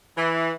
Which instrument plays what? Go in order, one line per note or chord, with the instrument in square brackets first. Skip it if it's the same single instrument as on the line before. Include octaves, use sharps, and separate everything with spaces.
[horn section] E3